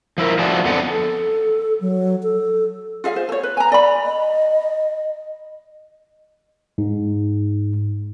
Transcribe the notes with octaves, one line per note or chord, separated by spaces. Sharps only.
F3 E4 A#4
F3 A3 D4 F#4 G#4
F2 D3 B3 A4 F#5
A4
F#3
A4
F4 G#4 E5 F5
C5
A4 C#5
B4
G#5 A#5
D5 B5
D#5
G#2